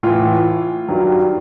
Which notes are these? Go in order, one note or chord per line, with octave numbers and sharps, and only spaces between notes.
A2 E3 F4
G2 D#3 F#3